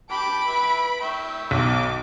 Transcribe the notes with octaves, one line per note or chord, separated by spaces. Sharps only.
G5 A5 B5 D6 D7
B4 E5
E5 G5 C#6 E6
B1 D6